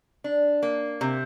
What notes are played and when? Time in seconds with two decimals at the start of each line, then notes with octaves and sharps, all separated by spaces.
0.24 D4
0.63 A#3
1.01 C3